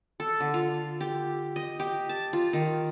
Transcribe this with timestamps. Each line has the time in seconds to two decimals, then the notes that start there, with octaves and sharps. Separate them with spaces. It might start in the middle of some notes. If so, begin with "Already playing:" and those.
0.20 A4
0.40 D3
0.54 F4
1.01 G4
1.56 D#5
1.80 G4
2.09 A5
2.33 F4
2.53 D#3